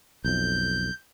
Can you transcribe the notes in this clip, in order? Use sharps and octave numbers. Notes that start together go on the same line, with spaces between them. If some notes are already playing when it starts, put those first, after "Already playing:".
B1 F2 G6